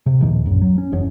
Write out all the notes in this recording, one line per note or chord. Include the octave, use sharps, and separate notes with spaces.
C3
D#2 A#2 D#3 F3
A#1 F#2
F#3
C#4
F#1 E2 C#4